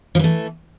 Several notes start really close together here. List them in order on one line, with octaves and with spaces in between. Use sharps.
F3 E3 A3